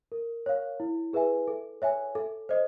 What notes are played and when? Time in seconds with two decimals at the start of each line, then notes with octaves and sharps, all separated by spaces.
0.12 A#4
0.46 C#5 F5
0.80 E4
1.13 G#4 B4 E5 G#5
1.48 A4
1.82 C#5 E5 G#5
2.15 A4
2.49 C5 D#5